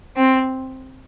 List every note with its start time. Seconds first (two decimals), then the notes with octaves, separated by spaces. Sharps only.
0.17 C4